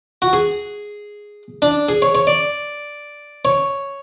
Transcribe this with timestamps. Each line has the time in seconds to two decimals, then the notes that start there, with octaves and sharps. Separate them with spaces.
0.22 F#4
0.33 G#4
1.62 D4
1.89 G#4
2.02 C#5
2.15 C#5
2.27 D5
3.45 C#5